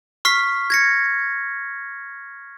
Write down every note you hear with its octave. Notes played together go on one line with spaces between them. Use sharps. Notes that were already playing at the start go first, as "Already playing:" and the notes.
C#6 F6 B6 C7
G#6 A#6 C#7